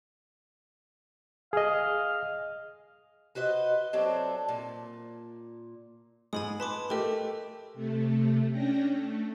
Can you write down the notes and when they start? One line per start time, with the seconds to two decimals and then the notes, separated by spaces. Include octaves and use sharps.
1.53 G#4 D#5 F5
3.35 F#4 B4 C5 D#5
3.93 F#3 A3 C4 D4
4.48 A#2
6.33 G#2 G#3 G#5 B5 D#6
6.60 B4 A5 C6 D6
6.90 A3 G4 A#4 D#5
7.74 C3 A3
8.51 C#4 D4 G5 A#6
8.90 A3